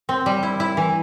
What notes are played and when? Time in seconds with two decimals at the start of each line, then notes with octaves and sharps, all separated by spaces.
0.09 C4
0.26 G3
0.43 E4
0.60 E4
0.77 E3